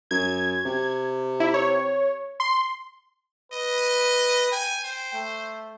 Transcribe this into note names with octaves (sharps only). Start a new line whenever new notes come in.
F#2 G#6
C3
E4
C#5
C6
B4 D#5
G5 G#5
C5
A3